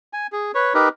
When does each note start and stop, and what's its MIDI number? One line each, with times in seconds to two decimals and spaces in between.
0.13 0.27 80
0.32 0.52 68
0.55 0.74 71
0.55 0.74 73
0.74 0.89 63
0.74 0.89 67
0.74 0.89 70
0.74 0.89 71